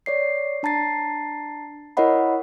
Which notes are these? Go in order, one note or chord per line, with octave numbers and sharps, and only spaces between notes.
C#5 D5 C7
D4 A5 A#5 A6 C7
E4 A#4 C#5 D#5 F#5 B5